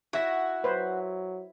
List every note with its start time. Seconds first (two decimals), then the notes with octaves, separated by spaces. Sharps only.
0.13 E4 F#4 E5 A#6
0.64 F#3 B4 C5